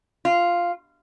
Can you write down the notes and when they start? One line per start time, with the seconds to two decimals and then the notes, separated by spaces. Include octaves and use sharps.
0.25 F4